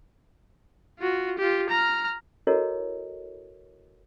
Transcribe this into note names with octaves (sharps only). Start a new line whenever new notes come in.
F4 F#4
F4 G4
A#5 F6
E4 F#4 A4 A#4 C#5 D#5